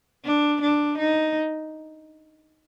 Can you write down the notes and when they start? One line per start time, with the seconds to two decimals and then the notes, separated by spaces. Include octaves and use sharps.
0.25 D4
0.61 D4
0.98 D#4